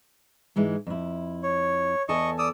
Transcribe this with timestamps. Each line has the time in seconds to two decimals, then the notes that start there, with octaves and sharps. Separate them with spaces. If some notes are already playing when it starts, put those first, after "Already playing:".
0.56 G#2 E3 G#3
0.87 F2 E4
1.43 C#5
2.09 E2 A4 D#5 G#5 C#6
2.38 D5 D#6 E6